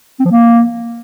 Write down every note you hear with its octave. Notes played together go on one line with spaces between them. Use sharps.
C4
F3
A#3